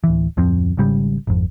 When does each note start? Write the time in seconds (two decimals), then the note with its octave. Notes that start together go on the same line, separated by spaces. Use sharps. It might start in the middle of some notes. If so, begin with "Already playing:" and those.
0.04 D1 E3
0.37 D1 F2 F3 C4
0.77 G#1 G#2 C#3 G3
1.27 G#1 F2